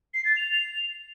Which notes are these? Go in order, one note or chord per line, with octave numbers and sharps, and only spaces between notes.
C7
A6
F7